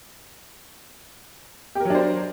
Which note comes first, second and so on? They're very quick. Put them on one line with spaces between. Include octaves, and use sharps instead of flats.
G4 A#4 F#3 D4 C5